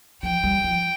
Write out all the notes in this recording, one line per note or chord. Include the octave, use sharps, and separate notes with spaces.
F3 G5
G3
F3